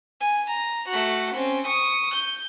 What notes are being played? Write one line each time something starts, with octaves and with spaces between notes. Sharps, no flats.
G#5
A#5
A3 F#4
C4 C#4
C#6 D#6
G6